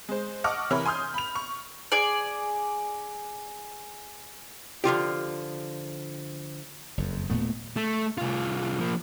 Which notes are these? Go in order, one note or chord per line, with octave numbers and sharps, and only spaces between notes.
G#3 C5
D#5 F#5 A5 C#6 D6 F6
C3 E3 A#4 C#5 B5 F6
G#5 C6 D#6 F6 G6
B5 F7
C#6
G#4 D5
D3 F3 F4 G4
F#1 F2
D#1 A#2 A3 B3
A3
C2 F4
F3 A#3